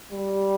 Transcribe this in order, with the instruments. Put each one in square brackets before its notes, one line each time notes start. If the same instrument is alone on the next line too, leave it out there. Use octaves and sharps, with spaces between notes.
[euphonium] G3